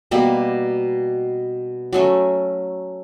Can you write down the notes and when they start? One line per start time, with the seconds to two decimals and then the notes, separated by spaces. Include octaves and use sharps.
0.11 B2 G3 A#3
1.93 F#3 A3 C#4